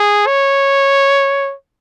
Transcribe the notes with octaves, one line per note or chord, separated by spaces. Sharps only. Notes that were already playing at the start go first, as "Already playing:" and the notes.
Already playing: G#4
C#5